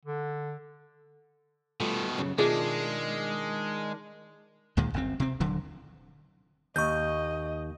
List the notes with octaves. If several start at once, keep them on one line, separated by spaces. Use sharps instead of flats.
D3
B2 D#3 G3 A3 F4
F#2 C#3
B2 D#3 G#3 D4 F4 G#4 E5
D2 A#2 D#3 G#3
G1 F#2 D3 C4
C3 C4
D#1 D3 F#3
D#2 D#5 C#6 G6